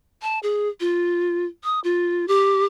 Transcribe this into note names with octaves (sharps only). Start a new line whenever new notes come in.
A5
G#4
F4
D#6
F4
G4